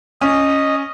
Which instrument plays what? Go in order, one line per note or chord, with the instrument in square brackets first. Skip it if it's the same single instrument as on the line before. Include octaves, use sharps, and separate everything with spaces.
[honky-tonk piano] C#4 [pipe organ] D#5